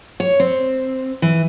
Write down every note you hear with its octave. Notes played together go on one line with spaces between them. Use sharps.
C#5
C4
E3